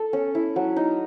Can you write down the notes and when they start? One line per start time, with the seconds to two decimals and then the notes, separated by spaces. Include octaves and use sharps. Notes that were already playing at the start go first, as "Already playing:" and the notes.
Already playing: A4
0.13 C#4
0.35 E4
0.56 F#3
0.76 D#4